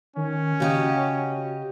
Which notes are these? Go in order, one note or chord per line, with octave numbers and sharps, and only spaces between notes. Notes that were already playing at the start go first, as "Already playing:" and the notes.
D#3 C#4
C#3 F#4 G4 D#5